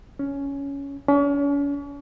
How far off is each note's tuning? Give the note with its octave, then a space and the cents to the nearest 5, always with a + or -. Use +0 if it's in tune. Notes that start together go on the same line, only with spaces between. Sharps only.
C#4 +10
C#4 +40